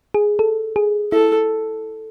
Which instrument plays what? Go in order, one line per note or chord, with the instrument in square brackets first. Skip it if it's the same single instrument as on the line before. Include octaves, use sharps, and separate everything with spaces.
[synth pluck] G#4
A4
G#4
[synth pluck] E4 [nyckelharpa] A4